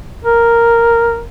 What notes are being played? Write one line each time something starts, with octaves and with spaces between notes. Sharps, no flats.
A#4